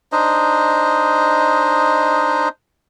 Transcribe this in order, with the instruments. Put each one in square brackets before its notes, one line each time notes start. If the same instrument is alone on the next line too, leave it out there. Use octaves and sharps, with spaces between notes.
[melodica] D4 D#4 C5 D#5